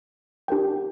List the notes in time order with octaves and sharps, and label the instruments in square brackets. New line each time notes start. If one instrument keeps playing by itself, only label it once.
[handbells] D4 G4 A#4 G5